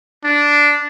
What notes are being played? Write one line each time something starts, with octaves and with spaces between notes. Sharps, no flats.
D4